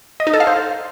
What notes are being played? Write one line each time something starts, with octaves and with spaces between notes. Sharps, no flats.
D#5
D#4
A4
F5
C5